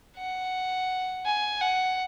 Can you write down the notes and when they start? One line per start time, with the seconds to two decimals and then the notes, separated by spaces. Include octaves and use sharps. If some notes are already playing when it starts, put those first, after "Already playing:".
0.17 F#5
1.26 G#5
1.61 F#5